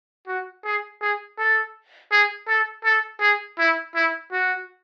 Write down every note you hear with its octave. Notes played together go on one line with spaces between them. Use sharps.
F#4
G#4
G#4
A4
G#4
A4
A4
G#4
E4
E4
F#4